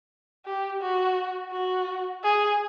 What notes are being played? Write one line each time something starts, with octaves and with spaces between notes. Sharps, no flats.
G4
F#4
F#4
G#4